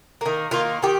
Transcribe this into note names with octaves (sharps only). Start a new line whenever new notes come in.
D#3 A#3
D#3 A#3 F4
D#3 G4